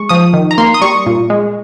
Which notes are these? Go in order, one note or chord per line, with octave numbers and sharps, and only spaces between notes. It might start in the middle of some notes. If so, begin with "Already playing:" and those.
Already playing: G#3 C#6
F3 D#6
D#3
A#5
A#3 C6
D#6
G3 C#6
A#2
G#3